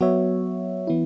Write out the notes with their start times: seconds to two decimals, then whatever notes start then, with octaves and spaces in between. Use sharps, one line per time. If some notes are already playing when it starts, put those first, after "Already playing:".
0.01 F#3 B3 F#4 C#5 E5
0.87 E3 B3 E4